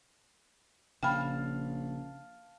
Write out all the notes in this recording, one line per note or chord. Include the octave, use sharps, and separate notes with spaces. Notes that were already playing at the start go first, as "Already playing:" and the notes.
A#1 C#3 F5 G5 A5 B5